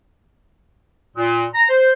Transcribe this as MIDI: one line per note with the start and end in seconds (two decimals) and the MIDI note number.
1.17 1.45 46
1.55 1.63 82
1.69 1.91 72